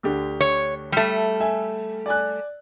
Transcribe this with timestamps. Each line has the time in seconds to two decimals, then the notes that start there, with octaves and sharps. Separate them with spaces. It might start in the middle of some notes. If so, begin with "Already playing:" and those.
0.03 D2 D3 G4
0.40 C#5
0.92 G3 A3
1.40 E5 G#5
2.06 D5 G#5 F#6